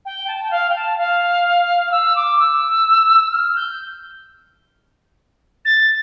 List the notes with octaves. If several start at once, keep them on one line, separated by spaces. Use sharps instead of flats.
G5
A5
G5
F5
G5
A5
F5
E6
D6
E6
F6
G6
A6